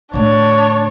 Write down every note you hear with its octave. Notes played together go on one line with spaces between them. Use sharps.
A2 D3 D4 C#5